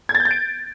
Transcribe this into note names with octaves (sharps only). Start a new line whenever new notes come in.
G#6
A6
G6
A6
D7